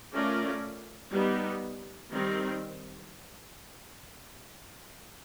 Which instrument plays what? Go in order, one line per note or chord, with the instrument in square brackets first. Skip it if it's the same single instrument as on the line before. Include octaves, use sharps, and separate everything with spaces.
[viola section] A3 C#4 F4 A#4 D5
G3 B3 D#4
D#3 G3 C4